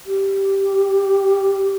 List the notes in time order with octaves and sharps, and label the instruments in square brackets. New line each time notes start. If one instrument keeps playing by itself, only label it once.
[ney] G4